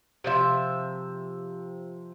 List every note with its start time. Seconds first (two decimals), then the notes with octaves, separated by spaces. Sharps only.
0.24 C3 F3 E5